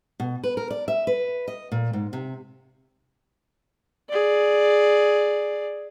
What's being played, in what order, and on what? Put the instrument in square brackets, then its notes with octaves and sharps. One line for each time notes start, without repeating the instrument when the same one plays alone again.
[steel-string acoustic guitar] B2
B4
A#4
D5
E5
B4
D#5
A#2
G#2
C3
[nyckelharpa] G#4 D5